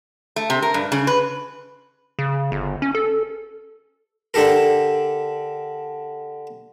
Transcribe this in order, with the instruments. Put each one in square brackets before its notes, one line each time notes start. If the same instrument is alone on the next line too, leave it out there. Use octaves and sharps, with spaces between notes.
[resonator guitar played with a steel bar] A3
C3
A#4
G2
C#3
B4
[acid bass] C#3
G1
C#4
A4
[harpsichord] D3 D4 G4 A4 A#4